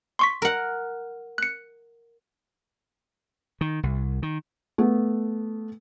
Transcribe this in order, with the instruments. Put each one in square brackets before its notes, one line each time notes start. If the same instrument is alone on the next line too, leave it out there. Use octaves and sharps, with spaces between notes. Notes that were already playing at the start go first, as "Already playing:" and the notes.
[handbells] C6 C#6 B6
[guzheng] A#4 F#5
[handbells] F#6 C#7
[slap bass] D#3
C2
D#3
[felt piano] A3 B3